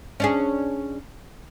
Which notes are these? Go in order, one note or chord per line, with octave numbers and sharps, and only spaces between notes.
C#4 D4 G#4